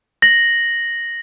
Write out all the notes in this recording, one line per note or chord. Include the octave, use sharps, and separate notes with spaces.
A#6 F#7